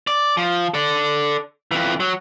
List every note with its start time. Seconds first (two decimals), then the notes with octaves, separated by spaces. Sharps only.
0.07 D5
0.37 F3
0.74 A4 D5
1.71 F2 E3
2.00 F#3